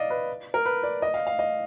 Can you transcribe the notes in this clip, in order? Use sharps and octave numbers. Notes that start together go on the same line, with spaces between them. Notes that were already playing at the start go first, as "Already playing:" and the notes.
Already playing: D5 D#5 F5
B4
A#4
B4
D5
D#5
F5
F5
D#5